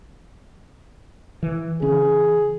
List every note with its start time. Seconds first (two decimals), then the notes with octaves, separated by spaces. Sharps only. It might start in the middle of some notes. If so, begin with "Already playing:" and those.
1.43 E3
1.82 C#3 E3 C#4 G#4